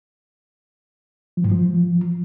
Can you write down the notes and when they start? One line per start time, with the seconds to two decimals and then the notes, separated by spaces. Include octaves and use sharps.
1.37 F3
1.44 G#2
1.51 F3